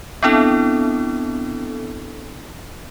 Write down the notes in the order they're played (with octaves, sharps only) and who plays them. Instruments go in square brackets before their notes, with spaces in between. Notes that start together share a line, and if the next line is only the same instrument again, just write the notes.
[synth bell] B3 C4 D4 E4 A4